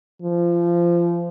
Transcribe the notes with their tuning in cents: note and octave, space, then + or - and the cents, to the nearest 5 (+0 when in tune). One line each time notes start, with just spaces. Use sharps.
F3 -25